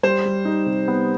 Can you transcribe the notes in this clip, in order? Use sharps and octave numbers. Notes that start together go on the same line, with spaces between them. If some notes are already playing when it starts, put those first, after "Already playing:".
G3 C5
G3
D#4
C3
B3